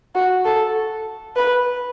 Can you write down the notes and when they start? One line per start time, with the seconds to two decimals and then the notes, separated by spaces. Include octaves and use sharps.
0.15 F#4
0.45 A4
1.36 B4